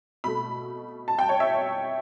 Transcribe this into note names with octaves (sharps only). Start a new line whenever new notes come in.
B2 A3 B5
A5
G5
C#5
E5